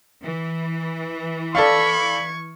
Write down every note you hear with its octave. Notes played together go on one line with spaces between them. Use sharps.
E3
A4 D5 F5 B5 C#6 G#6